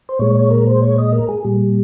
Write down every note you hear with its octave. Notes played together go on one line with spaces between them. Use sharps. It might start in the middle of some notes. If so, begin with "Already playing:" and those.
C5
A#2 G#3 C#5
C#5
A#4
C5
C#5
D#5
A#4
G#4
A#2 G3